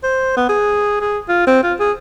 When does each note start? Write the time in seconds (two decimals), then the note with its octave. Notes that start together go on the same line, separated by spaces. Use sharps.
0.04 C5
0.37 B3
0.49 G#4
1.01 G#4
1.29 F4
1.47 C4
1.63 F4
1.80 G#4